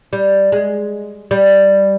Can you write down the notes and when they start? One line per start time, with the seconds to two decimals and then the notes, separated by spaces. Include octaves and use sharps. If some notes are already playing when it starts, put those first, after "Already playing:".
0.13 G3
0.52 G#3
1.31 G3